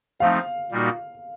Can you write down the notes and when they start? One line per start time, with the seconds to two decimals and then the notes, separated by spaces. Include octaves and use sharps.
0.20 F3 A3 C4 D#4 F5
0.72 A#2 G3 A#3 D#4 F#4